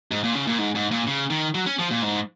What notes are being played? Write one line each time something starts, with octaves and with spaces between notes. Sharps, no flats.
G#2
A#2
C#3
A#2
G#2
G#2
A#2
C#3
D#3
F#3
C#4
F3
A#2
G#2